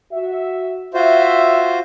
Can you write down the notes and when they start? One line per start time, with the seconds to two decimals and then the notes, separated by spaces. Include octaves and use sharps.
0.12 F#4 E5
0.94 F4 F#4 C5 E5